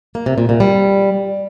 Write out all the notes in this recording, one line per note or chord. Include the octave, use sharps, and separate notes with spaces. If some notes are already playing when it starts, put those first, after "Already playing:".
A#3
C3
A#2
A#2
G3